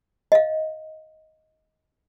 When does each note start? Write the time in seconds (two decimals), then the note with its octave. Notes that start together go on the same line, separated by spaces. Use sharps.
0.32 D#5 F5